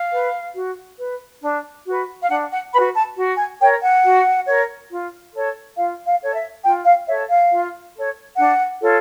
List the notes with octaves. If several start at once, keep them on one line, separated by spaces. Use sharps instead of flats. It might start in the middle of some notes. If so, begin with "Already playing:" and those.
Already playing: F5
B4
F#4
B4
D4
F#4 B4
F5
D4 F#5
F#5
F#4 B4 B5
A5
F#4
G#5
A#4 C#5 G5
F#5
F#4
A#4 C#5
F4
A4 C#5
F4 F5
F5
A4 C#5
E5
F4 G5
F5
A4 C#5 E5
F5
F4
A4 C#5
D4 F#5
F4 A4 C#5